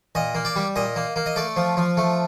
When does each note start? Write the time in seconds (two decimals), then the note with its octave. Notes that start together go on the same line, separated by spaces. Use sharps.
0.15 A#2 D#5
0.35 A#3
0.45 D5
0.56 G3
0.76 A#2 D#5
0.96 A#3
1.16 A#3
1.26 D#5
1.36 A3 D5
1.56 F3
1.77 F3
1.97 A3